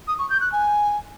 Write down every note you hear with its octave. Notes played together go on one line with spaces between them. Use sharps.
D#6
C#6
G6
F#6
G#5